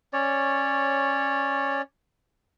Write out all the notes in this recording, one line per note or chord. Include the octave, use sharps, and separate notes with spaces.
C#4 C#5 D5